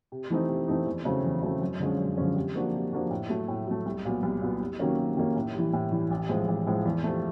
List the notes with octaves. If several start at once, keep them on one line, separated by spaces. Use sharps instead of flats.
C3
E3 A3 C4 D#4
C3
E3 A3 C4 D#4
E2
C#3 F#3 A3 C4
E2
C#3 F#3 A3 C4
F#2
D3 F3 G#3 C#4
F#2
D3 F3 G#3 C#4
C3
F3 A#3 D4 F#4
C3
F3 A#3 D4 F#4
A2
F#3 A3
A2
F#3 A3
C2
A#2 F#3 B3
C2
A#2 F#3 B3
C3
D#3 F#3 A#3 C#4
C3
D#3 F#3 A#3 C#4
A2
E3 G3
A2
E3 G3
A1
A2 F3 G#3
A1
A2 F3 G#3
E2
C3 F3 A3